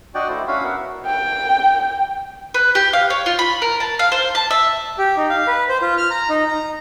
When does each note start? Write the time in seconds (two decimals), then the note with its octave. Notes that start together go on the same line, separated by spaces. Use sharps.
0.15 D4 F#4 D5 D#5 G5
0.28 A3 E4 C5
0.48 C#4 D4 E4 F#4 F5 B5
0.64 B3 A#4 E5 F#5
1.06 G5
2.54 B4
2.75 G4
2.93 F5
3.10 C#5
3.26 F4
3.39 B5
3.62 A#4
3.80 A5
3.99 F5
4.12 C5
4.35 A5
4.51 E5
4.98 G4
5.17 D#4
5.30 F5
5.47 B4
5.69 C5
5.82 F4
5.97 F6
6.11 A#5
6.29 D#4
6.48 A#5